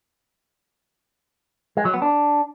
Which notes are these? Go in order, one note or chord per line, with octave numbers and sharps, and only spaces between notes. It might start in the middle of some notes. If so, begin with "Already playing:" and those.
G#3
F#3
B3
D4